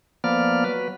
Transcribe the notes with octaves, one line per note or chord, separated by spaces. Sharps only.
F3 A#3 B3 D5 F6
F#3 B4